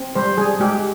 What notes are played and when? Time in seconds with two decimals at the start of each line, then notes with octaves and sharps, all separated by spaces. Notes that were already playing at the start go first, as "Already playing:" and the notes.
Already playing: C4
0.15 G3 C5
0.37 G3 G#4
0.60 G#3 G4